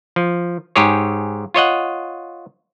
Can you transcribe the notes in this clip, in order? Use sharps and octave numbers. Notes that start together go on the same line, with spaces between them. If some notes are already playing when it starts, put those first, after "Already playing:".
F3
G#2 G4 G#4 C#5
F4 C#5 D#5 F#5